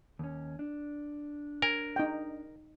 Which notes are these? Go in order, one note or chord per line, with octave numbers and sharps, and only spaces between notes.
D#2 C#4
D4
A#4 G#5
D#4 G5